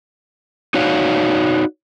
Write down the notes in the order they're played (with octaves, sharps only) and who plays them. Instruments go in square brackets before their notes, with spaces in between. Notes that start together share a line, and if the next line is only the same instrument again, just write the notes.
[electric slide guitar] D#4 F#4 C#5 D5 F5